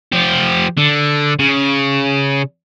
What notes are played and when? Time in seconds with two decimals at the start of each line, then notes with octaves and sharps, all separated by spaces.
0.12 F3 G4
0.77 D3
1.39 C#3